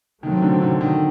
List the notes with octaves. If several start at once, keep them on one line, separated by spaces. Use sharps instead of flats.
A2 D#3 F#3 A3 C4
D3
D3
D#3